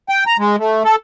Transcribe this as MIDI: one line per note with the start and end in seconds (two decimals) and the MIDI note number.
0.09 0.24 79
0.27 0.37 82
0.39 0.56 56
0.59 0.83 57
0.85 0.96 69